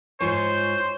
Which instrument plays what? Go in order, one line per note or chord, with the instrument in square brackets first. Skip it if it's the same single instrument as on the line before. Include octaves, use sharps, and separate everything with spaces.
[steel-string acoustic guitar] G#2 F4 G#5 [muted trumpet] C5 [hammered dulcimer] C#5